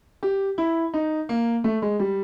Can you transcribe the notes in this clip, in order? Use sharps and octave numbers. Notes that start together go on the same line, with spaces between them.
G4
E4
D#4
A#3
A3
G#3
G3